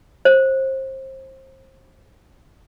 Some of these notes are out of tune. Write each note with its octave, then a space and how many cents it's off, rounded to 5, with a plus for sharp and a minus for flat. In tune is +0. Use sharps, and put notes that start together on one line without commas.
C5 +25